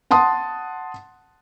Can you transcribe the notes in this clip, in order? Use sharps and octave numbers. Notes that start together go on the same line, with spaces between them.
F#5 A5 C6 D#6